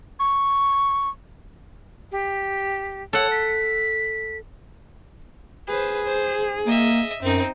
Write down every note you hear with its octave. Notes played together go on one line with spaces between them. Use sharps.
C#6
G4
A4 C#5 F#5
B6
G#4 B4 C5
C5
A#3 D#5 E5
F#2 C4 D#4